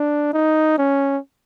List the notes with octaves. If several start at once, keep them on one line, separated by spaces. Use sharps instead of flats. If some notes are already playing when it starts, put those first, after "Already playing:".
Already playing: D4
D#4
C#4